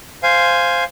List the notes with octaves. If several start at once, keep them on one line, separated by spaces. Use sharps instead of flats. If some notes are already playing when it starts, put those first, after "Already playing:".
C5 F5 G#5